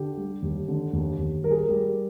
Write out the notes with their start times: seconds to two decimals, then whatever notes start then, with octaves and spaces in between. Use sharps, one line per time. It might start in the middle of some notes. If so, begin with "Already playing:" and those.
Already playing: D3 G4
0.17 G3
0.42 D#2
0.68 D3
0.93 D#2
1.18 D#2
1.43 G3 A#4
1.51 G#4
1.58 A#4
1.69 G3